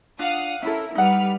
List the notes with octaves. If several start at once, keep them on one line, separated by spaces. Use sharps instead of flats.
D4 F4 F5 F#5 D#6
C#4 E4 A4 A#4
G3 D#4 B4 F#5 F6